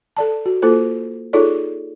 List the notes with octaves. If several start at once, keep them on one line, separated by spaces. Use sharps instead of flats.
A4 D5 A5
F#4
A#3 F4 A4 C5
D#4 F4 G#4 A4 C#5 D5